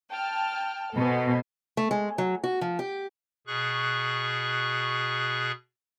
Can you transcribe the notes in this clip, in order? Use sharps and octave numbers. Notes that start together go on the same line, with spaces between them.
G5 A5 F6
B2 A4 C5 G#5
A3
G#3
F#3
F#4
F3
G4
B2 G#4 C#6 F#6